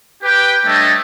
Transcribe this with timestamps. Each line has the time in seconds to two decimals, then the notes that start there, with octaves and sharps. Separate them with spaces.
0.23 G4 B4 G5
0.66 G3 A3 D4 A4 C#5 D#5